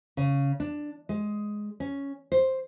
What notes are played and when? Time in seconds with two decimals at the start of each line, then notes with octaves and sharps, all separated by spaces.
0.17 C#3
0.60 D4
1.09 G#3
1.80 C#4
2.32 C5